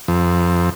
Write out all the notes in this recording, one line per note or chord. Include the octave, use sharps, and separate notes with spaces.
F2